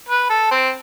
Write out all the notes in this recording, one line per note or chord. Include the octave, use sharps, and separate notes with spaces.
B4
A4
C4